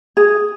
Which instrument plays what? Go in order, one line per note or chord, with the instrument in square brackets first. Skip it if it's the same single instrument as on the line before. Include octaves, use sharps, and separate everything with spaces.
[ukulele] G#4